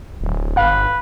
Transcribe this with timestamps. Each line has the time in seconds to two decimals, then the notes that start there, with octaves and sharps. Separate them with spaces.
0.21 D1
0.57 G1 B4 F5